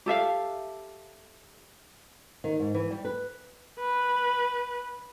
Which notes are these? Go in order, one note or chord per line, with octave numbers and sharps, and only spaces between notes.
G4 A4 E5 F5
D#3
G#2
E3
G3
B4
B4